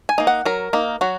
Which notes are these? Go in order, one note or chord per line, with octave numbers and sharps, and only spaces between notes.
G#5
A#3 D#4
F#5
F#3 A#4
A#3 D#4
F#3 F#4